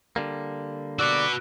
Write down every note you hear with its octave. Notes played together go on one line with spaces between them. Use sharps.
D3 G3 A#3
F#4 B4 D5 E6 F#6 D7